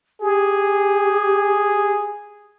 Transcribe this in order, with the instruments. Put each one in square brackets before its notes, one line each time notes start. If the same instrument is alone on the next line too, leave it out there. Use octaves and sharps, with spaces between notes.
[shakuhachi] G4 [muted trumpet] G#4